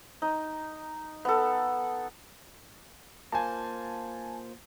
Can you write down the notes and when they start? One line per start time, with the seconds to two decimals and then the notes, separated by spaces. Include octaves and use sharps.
0.22 D#4
1.25 B3 A4
3.32 A#3 F4 C5 G#5 A5